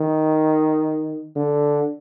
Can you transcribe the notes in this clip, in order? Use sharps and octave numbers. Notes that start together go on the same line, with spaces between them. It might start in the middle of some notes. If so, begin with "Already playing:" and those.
Already playing: D#3
D3